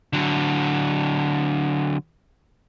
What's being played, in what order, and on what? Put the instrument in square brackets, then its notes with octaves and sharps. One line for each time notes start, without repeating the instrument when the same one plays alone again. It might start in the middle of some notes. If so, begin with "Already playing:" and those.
[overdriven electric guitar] D3 F#3